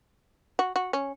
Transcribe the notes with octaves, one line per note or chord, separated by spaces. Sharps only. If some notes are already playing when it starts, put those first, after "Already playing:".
F#4
F#4
C#4